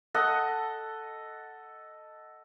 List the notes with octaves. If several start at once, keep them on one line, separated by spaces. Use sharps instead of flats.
A4 D#5 F#5